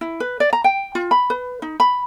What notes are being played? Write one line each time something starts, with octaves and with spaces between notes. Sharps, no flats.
E4
B4
D5
A#5
G5
F4
B5
B4
D#4
B5